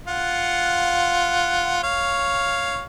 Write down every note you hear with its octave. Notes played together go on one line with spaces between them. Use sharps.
F4 F#5
C#5 F5